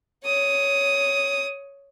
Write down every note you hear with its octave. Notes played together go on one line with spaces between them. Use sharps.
C#5 D#6